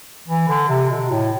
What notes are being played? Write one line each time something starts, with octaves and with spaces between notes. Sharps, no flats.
E3
D3
C3
B2
A2